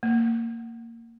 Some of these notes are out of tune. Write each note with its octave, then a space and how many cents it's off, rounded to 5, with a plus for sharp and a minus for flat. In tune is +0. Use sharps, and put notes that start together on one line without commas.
A#3 -15